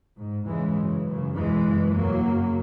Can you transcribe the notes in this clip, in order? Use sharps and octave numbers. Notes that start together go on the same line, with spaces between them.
G#2
E2 C#3 E3 G#3
F#2 C#3
F#2 C#3
E2 B2 E3 G#3
F#2 C#3
E2 B2 F#3 A#3
F#2 C#3